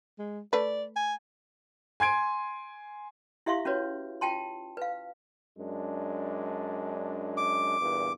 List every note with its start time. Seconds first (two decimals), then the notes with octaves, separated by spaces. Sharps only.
0.19 G#3
0.53 A3 B4 D5
0.96 G#5
2.00 G#5 C6 G#6 D7
3.46 E4 G4 E5 F5 C6 C#6
3.65 C#4 F#4 B4 C#5
4.21 F4 G5 A5 C6
4.77 B4 F5
5.58 F#2 G#3 D4
7.37 D6
7.80 E2 G2 A#2